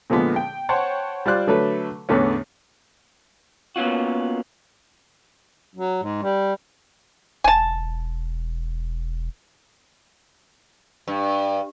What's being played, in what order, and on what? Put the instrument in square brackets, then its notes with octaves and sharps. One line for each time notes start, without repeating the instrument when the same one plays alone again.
[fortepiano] A#2 D3 F3 G#3 B3
G5
C5 C#5 F#5 G5 A5 C6
G3 F4 C5 D5 F#6
D3 F#3 A3 A4 B4
E2 A2 D3 B3 C#4
[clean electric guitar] A#3 B3 C#4 F4 F#4
[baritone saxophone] F#3
G#2
G3
[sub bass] E1 [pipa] G#5 A5
[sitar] G2